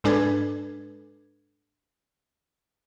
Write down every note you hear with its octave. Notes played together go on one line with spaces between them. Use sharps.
G#2 G#3 D4 A4 B4 G#6